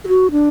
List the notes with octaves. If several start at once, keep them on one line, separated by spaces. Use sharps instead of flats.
G#4
F#4
D4